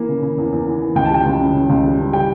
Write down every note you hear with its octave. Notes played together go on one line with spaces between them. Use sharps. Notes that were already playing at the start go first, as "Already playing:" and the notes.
Already playing: E3 A#3
C#3
C#3
E2
E2
E3
E3
C#2 G5
A5
G3 G5
C#2
C#3
C#3
C#2
G3
C#3
G3 G5